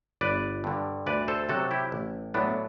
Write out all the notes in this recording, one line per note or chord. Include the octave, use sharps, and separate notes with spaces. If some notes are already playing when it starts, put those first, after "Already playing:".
G1 B4 D5
G2 D3
D2 B4 D5
A4 C5
C3 F#3 F#4 A4
E4 G4
A1
A2 F#3 B3 D4